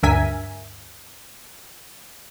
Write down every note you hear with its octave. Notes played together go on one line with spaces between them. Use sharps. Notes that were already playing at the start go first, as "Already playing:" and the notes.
D2 G2 A#4 E5 G#5 B6